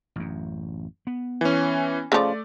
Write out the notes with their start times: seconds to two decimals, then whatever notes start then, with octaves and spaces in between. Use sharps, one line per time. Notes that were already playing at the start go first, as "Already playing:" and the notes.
0.16 A1 F#2
1.07 B3
1.41 E3 C#4
2.12 C#3 F3 A3 D5